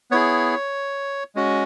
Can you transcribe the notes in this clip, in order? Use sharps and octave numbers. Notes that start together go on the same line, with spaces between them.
B3 E4 G#4 C#5
G#3 C#4 F#4